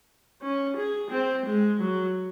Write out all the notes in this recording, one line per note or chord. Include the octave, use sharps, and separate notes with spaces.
C#4
G#4
C4
G#3
F#3